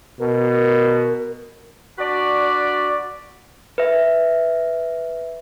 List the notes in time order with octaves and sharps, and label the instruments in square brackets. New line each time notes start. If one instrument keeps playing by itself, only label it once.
[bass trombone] B2 [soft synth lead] A#4
[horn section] D4 F#4 B4 D5
[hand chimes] B4 E5